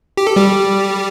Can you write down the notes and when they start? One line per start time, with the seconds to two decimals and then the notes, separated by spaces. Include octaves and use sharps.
0.17 G4
0.27 A4
0.36 G3 G4